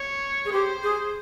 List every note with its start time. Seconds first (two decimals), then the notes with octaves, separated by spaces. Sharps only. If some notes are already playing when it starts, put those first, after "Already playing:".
Already playing: C#5
0.45 G#4
0.52 G4 C5
0.83 G#4